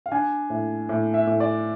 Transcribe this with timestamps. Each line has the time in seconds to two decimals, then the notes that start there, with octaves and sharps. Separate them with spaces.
0.06 F5
0.12 D4 G#5
0.50 A2
0.89 A2
1.14 E5
1.27 A2
1.40 D5